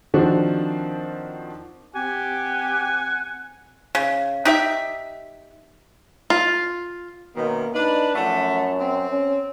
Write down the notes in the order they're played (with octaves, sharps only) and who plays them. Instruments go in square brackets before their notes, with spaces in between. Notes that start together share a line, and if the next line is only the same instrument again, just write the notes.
[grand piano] D#3 F3 C4 D4 F#4
[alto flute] C4 [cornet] G4 [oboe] F#5 [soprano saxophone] G#5
[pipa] C#3
D#4 G4 E5
[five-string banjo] F4
[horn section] F#2 B2 D#3 [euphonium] A#3
[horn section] D4 B4 [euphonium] D#4
[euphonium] F#2 [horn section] F3 A3 F#5
[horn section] C4
[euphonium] C#4